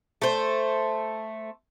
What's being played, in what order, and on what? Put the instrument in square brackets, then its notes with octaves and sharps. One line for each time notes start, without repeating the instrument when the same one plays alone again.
[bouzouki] A3 C5